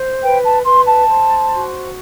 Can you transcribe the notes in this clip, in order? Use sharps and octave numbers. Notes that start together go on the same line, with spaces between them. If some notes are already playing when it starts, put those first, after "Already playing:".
Already playing: C5
B4 G5
A5
B4 C6
A5
C5
F#4